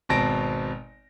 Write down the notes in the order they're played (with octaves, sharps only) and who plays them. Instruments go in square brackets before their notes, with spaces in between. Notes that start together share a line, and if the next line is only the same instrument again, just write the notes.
[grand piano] G#1 B2 C4 A5 A#6 D7